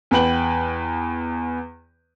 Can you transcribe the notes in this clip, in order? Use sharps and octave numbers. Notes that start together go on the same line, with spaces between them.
E2 B3 B4 G5 F#7